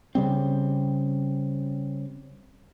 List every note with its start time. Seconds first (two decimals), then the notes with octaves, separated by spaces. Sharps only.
0.15 C#3 G3 C4